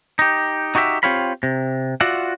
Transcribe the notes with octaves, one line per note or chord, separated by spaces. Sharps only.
D#4 G4
D#4 F#4 G4 D5 E5
C4 F4 G4 C#5 F5 B5
C3
F4 F#4 D5 E5 F#5